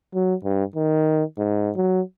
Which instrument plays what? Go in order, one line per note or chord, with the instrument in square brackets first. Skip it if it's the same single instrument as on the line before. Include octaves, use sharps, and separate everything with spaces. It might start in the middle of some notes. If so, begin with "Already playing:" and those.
[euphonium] F#3
G2
D#3
G#2
F#3